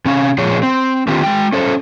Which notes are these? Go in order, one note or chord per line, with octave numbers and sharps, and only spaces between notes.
C3 C#4 F5
A#2 F3 G#4 C#5
C4
D3 D#3 C4 F4 G4
G#3 G5
C#4 A4 C5